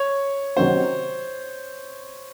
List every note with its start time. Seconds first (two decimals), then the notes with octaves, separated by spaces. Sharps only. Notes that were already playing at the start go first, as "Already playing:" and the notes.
Already playing: C#5
0.56 C3 D#3 F#3 C#4 F#4 C5